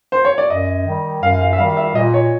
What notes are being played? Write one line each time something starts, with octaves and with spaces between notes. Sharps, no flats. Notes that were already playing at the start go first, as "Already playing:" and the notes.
C5
C#5
D5
F#2 D#5
D#3 G3
F#2 F5
F5
E5
D#3 G3 F5
E5
A#2 D#5
C#5